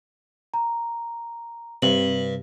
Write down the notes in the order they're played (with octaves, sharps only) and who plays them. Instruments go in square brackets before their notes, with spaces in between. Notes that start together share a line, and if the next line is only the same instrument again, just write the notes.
[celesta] A#5
[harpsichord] G2 [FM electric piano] C3 [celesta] F#7